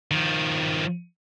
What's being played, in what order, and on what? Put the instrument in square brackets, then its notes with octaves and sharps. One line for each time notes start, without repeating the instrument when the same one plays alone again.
[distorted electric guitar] D#3 F3